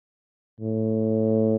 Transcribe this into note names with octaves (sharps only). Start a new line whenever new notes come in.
A2